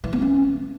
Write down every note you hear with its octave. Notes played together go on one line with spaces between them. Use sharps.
E3
B3
C#4